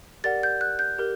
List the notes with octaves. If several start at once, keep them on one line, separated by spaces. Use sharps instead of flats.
G4 A#4 D5 F#5 A6
G6
F#6
G6
G4 A#4